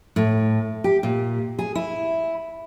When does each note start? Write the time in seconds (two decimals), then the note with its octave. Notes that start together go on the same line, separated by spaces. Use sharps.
0.16 A2
0.84 G4
1.03 A#2
1.59 G#4
1.75 E4